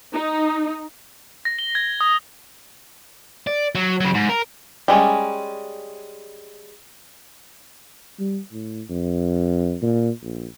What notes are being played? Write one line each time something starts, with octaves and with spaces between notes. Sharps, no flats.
D#4
A#6
G7
G#6
D#6
D5
F#3
C#3 F#3
G#2
A#4
G3 G#3 C4 C#4
G3
A2
F2
A#2
A#1